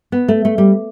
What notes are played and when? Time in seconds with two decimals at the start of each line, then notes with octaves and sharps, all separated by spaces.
0.12 B3
0.28 A3
0.45 A3
0.58 G3